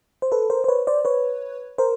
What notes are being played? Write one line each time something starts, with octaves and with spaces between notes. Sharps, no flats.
C5
A4 B4
A#4 C5
C5
B4 C#5
C5 D5
B4 C#5
A#4 C5